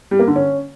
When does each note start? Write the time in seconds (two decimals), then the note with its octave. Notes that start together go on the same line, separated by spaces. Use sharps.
0.11 G3
0.19 A#3
0.28 D3
0.36 C#4